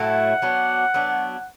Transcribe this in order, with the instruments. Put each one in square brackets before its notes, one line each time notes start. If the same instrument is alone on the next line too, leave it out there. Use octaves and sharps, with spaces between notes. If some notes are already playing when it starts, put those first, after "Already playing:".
Already playing: [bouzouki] A2 F#3 A3 E4 [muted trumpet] F#5
[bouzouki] F#3 B3 D4
F#3 B3 D4